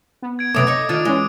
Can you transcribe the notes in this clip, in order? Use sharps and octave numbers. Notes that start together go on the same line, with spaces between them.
B3
G#6 D7
F#2 C3 A3 B3 D6 D#6 D7
D#4 C#5
D#3 D4 F4
E3 G#3 C#4